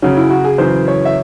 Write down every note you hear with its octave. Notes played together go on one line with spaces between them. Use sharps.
F#2 C#3 F#3 C#4
E4
F#4
G#4
F#2 C#3 E3 C5
C#5
E5